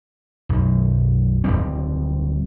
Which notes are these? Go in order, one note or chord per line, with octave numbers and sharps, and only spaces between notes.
B1 F#2
D1 D#2 G3 C4